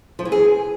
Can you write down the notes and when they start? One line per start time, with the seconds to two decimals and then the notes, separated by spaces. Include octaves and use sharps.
0.19 F3
0.25 E3
0.32 G#4